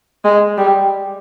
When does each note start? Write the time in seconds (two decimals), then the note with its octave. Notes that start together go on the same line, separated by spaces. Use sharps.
0.25 G#3
0.58 G3